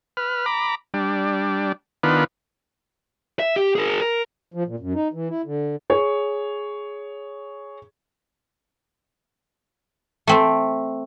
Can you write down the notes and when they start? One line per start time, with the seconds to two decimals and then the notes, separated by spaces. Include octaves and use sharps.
0.17 B4 F6
0.46 A#5 B5 D6
0.94 G3 D4
2.03 D#3 B3 D4 F4 B4
3.39 E5
3.56 G4
3.75 G#4 A#4
4.01 A#4
4.54 F3
4.67 A#2
4.80 F#2
4.94 D#4
5.13 E3
5.29 E4
5.46 D3
5.90 G#4 C#5
10.27 A3 C4